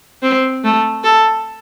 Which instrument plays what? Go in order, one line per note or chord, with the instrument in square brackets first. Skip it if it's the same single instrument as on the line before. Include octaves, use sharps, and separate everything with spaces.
[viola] C4
A3
A4